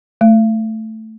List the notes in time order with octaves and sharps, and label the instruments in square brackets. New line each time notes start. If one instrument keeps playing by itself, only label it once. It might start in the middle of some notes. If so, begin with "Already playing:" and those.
[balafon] A3